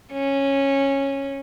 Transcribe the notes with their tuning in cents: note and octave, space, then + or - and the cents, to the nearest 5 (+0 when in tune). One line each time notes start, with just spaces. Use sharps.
C#4 -10